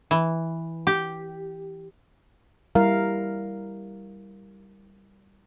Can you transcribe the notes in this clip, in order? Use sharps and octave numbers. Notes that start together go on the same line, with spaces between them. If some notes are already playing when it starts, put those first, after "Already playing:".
E3
G4
G3 E4 A#4 F5